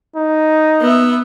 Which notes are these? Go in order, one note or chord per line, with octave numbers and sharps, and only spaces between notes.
D#4
B3 E5